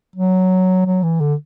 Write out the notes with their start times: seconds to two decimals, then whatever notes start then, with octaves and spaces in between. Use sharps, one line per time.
0.16 F#3
0.86 F#3
1.03 E3
1.21 D3